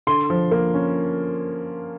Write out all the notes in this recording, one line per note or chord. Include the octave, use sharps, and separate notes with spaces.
D3 C6
F3
A#3
C#4